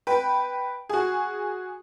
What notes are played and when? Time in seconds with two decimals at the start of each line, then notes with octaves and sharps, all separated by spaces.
0.07 B4 G5
0.89 F#4 G#4